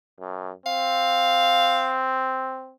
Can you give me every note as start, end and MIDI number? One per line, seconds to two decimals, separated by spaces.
0.20 0.51 42
0.66 2.73 60
0.66 2.08 77